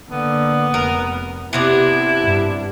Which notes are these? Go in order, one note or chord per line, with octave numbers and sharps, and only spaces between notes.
D3 A#3 B3
F1 A#4
C3 B3 C4 D4 E4
G2